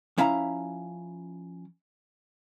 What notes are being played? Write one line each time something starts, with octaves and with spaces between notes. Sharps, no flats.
F3 C#4 E4 F5 A#5